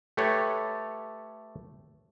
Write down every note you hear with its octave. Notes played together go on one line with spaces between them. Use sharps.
A3 G4 A4 B4 C#5